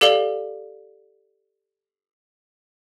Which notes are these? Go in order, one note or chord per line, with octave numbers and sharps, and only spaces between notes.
G4 A4 D5 F5 F#7 G7